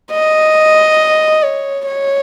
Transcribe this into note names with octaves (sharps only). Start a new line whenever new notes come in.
D#5
C#5
C#5